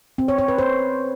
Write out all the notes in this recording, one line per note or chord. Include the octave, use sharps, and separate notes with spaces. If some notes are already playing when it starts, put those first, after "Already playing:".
C4
C#5
C#5
B4
C5